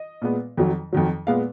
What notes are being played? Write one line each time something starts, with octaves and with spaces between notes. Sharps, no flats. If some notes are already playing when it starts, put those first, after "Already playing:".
Already playing: D#5
A#2 G#3 B3
F2 D#3 F#3
F2 D#3 F#3
A#2 G#3 B3 F5